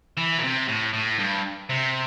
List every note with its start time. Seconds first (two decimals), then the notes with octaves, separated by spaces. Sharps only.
0.17 E3
0.39 A#2
0.44 C3
0.68 A2
0.94 A2
1.19 G2
1.70 C3